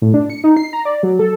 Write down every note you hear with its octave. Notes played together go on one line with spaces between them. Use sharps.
A2
D4
C#7
D#4
C7
A#5
D5
F#3
A4